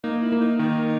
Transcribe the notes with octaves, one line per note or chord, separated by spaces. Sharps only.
A#3 D#4
E4
A#3
D#4
D#3 D#4